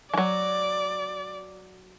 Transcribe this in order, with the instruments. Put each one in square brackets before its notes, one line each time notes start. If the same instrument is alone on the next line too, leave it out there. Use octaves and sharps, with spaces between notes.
[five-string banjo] E3 F#3 [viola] D5